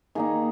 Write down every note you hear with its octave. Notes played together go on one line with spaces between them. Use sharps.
D#3 A#3 D#4 G#4